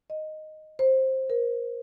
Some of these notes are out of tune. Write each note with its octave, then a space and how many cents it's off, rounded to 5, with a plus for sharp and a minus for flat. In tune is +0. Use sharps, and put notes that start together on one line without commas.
D#5 -5
C5 +15
A#4 +25